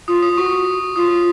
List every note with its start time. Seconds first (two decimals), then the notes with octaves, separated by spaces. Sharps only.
0.08 F4 D#6
0.23 D#6
0.37 F#4 C#6
0.96 F4 D#6